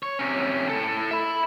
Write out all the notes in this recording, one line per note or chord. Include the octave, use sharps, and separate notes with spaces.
C#5
C3 C#4
A2 A4
E5 B5